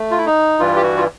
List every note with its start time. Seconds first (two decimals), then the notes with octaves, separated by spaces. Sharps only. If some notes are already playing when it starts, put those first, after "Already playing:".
Already playing: A3
0.11 F4
0.18 E4
0.26 D#4
0.59 G2 E3 G3 F4
0.76 G4
0.83 F#4
0.97 F4